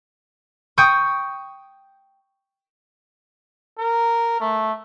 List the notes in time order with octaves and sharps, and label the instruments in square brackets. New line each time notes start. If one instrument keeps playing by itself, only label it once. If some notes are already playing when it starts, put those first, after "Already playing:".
[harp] G5 C#6 D#6 G6
[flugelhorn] A#4
A3